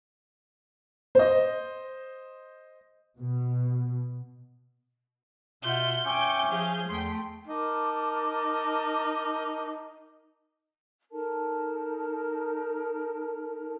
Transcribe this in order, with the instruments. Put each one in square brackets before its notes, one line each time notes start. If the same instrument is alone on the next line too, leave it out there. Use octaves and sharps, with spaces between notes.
[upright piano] C5 D#5
[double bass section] B2
[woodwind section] B2 [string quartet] F4 E5 F#5 [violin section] G6
[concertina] C#4 [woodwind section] E5 D6 [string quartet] G5 G#5 C#6
[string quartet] F3 G#4 F5
[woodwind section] E2 [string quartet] A3 G5 [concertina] C6
[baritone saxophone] D#4 [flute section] A#4 A5 D6
[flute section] D#4 A4 A#4 A5